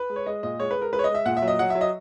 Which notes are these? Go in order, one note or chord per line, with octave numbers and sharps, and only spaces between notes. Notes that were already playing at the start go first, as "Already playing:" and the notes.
Already playing: B4
G#3
C#5
G#3 D#5
A#2 D#5
G#3 C#5
B4
G#3
A#4
G#3 B4
C#5
D#5
G#3
E5
A#2 F#5
E5
F#3
D#5
F#3 F#5
E5
F#3
D#5